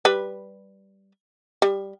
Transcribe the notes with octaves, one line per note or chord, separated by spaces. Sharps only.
G3 B4
G3